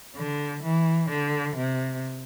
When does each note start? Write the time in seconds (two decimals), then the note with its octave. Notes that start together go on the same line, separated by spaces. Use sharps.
0.16 D3
0.62 E3
1.10 D3
1.56 C3